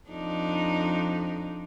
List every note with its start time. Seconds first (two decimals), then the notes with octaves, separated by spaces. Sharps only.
0.10 F2 D4 D#4